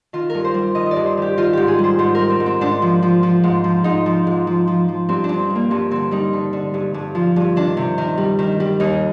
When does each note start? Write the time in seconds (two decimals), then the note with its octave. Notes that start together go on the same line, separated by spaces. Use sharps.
0.13 D#3 F4
0.30 G2 A#4
0.44 C5
0.54 G3
0.75 D#3 D#5
0.86 D5 D#5
0.96 G2
1.06 C5
1.17 D#3 G4
1.37 D#3 F4
1.53 G#2 G4
1.68 G#4
1.78 G3
1.84 C5
1.99 G#2 C5
2.15 G3 A#4
2.30 C4
2.40 G#2
2.46 C4
2.61 G#2 D4
2.82 F3
3.02 F3
3.23 F3
3.44 G#2
3.64 F3
3.84 G#2 D#4
4.06 F3
4.27 G#2
4.47 F3
4.67 F3
4.88 F3
5.09 G2 C4
5.24 D4
5.29 G2
5.39 C4
5.50 G3
5.55 A#3
5.71 G2 C4
5.91 D3 C4
6.11 G3 D#4
6.33 D3
6.53 D3
6.74 G2
6.94 G2
7.15 F3
7.36 G2
7.56 D#3 D4
7.77 C3
7.98 D#3
8.18 G3
8.39 D#3
8.60 G3
8.80 D#2 D#4